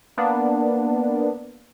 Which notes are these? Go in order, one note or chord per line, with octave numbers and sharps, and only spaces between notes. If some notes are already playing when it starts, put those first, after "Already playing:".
A#3 B3 D4